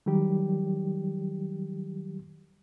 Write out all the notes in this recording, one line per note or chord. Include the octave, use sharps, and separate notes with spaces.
D#3 F#3 G3 G4